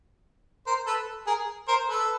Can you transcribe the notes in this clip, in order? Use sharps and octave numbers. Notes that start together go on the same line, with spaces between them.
A#4 C5
A4 B4
G#4 A#4
A#4 C5
A4 B4